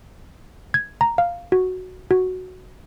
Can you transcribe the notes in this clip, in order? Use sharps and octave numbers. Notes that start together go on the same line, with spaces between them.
G#6
A#5
F5
F#4
F#4